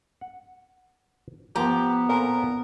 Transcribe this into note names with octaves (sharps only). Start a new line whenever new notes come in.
F#5
F3 B3 G4 A#5
A#2 C4 A4 A#4